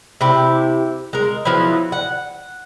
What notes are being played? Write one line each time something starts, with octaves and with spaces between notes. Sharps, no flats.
C3 E4 G4
G#3 A#4
F3 F#3 B3 E4
F#5